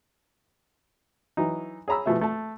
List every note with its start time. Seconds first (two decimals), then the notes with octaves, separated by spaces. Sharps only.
1.37 E3 F#3 D#4
1.88 G#4 C#5 A#5 B5 E6
2.06 B2 E3 F3 A3 G4 E5
2.21 A3 A5